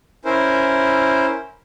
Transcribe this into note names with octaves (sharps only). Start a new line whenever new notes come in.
C#4 E4 A#4 C5